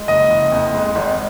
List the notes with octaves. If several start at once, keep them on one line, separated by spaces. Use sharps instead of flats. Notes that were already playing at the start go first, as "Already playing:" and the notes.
Already playing: G#3
F#1 D#5
F#1
F2
G#3
G#1